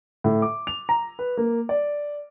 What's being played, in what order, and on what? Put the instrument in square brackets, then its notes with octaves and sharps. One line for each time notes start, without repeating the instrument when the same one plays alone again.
[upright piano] A2
D6
F7
A#5
B4
A#3
D5